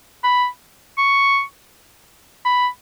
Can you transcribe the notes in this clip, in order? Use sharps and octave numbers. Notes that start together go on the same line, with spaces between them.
B5
C#6
B5